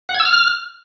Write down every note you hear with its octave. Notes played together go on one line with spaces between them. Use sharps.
F#5
G#6
E6
F6